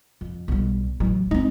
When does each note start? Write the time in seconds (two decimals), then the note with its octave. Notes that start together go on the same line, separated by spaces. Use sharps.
0.21 F2
0.48 B1 G3
1.00 A1 F#3
1.31 G#3 C4 D#4